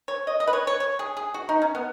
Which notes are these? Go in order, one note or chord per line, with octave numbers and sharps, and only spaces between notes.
C#5
D#5
D#5
B4
C#5
C#5
C#5
G#4
G#4
F#4
D#4
C#4
B3